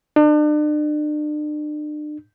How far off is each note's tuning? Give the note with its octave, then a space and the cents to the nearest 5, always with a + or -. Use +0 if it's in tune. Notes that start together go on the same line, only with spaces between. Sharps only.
D4 +40